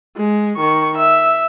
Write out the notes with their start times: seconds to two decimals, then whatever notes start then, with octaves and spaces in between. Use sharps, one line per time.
0.17 G#3
0.57 D#3 C#6
0.98 E5